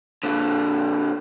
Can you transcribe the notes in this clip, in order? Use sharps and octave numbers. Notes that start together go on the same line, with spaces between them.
A#2 D3